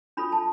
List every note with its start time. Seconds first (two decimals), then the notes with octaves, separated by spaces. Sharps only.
0.17 D4 F4 A4 B5
0.32 A5